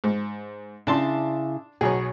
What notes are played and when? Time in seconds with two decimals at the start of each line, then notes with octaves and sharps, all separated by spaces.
0.04 G#2
0.87 C#3 D4 E4 A5 C6
1.81 B1 B2 G#4 C#5